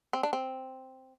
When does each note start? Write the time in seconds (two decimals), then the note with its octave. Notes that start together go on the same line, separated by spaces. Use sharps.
0.13 C4
0.23 D4
0.33 C4